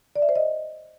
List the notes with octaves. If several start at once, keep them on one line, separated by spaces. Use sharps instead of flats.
D5
E5
C5
D#5